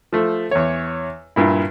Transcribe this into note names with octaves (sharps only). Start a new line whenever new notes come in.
F3 A3
E2 C#5
G2 A#2 E4